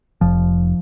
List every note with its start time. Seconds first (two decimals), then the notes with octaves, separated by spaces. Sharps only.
0.21 F1 F3